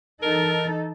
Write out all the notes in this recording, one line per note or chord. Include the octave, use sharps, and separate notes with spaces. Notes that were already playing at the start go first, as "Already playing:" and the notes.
E3 D#4 A4 A#4